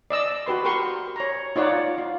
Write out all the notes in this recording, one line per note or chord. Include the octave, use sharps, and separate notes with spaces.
D5 D#5 E6
F#4 G4 B4 C6
G4 A#4 C6 C#6
C#5 A#5
D#4 F4 C#5 D5 F#5
F4